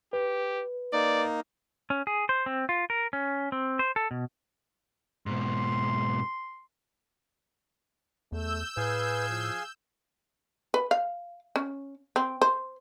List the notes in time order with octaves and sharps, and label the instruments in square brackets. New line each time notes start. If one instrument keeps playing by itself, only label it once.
[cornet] G4 [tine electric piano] B4
[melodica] A#3 D#4 [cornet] D5
[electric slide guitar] C#4
G#4
C5
C4
F4
A#4
C#4
C4
C5
A4
B2
[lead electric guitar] G#2 B2 [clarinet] C6
[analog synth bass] E2 [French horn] A3 [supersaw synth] E6 G6
[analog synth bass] A2 [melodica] G#4 F5 G#5 [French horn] B4
[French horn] F3
[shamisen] B4
F5
C#4
C4
C5